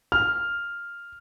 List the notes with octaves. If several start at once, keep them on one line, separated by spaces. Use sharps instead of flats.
F6